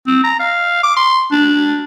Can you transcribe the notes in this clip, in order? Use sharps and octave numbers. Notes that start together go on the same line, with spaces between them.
C4
A#5
F5
D6
C6
D4